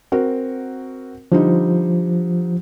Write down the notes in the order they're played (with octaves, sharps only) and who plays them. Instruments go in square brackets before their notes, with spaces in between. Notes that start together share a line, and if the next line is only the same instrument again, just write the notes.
[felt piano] C4 F#4 A#4
[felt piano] D3 G3 D#4 [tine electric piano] F3